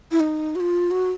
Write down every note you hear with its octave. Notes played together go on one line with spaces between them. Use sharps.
E4
D#4
F#4
F4
F#4